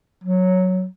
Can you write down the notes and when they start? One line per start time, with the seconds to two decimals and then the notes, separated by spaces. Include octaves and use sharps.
0.24 F#3